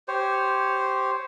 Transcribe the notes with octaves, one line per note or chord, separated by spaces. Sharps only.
G4 C5 C#5